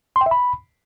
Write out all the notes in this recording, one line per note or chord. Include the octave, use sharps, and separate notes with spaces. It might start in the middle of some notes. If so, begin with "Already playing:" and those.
C6
G5
E5
B5